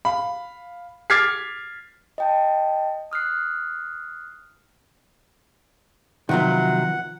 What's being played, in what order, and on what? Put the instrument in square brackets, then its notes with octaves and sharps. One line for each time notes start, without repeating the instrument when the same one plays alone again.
[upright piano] F5 B5
D6 F6 G#6 A6 B6 C7
[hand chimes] D#5 G5 A5
D#6 F6 F#6 C7
[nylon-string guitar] C3 F#3 [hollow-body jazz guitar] D#3 F3 B3 [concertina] F#5